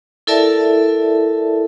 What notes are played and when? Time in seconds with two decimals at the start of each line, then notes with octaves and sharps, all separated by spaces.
0.27 E4 A4 A#4 D5 E5 A5